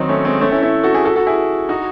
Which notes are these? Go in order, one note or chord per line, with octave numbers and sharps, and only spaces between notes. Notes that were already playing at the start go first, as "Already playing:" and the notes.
Already playing: D#3 F#3 C4 D#4
A3 C#4
G#3 C4
A3 C#4
C#4 E4
C#4 E4
F#4 A4
E4 G#4
F#4 A4
F#4 A4
E4 G#4
D#4 F#4